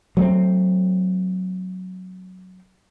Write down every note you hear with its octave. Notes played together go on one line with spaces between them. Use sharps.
F#3 A3 C4